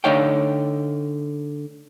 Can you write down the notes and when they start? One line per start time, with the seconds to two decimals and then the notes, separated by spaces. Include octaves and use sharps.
0.04 D3 A3 D#4 C#5 F5 G5